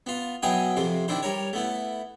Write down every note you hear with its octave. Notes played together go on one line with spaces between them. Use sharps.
B3 F4
B2 F#3 E4 G5 G#5 D#6
F2 C3 C5
D#3 D4 E4 C5
G3 A#4 C#5
A3 B3 E4